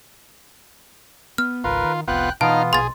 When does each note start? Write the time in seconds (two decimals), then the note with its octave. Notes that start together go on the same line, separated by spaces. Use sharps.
1.38 B3 F6
1.64 G#1 C#2 F4 A#4 B4
1.84 D#3
2.08 F1 C2 B3 F4 G5 F#6
2.41 B2 E3 B3 D#4 F4 F5 A5
2.73 A#1 B2 G#4 C6 A6